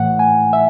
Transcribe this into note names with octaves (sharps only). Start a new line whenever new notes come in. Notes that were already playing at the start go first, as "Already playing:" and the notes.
Already playing: A2 E3 A3 F#5
G#5
E5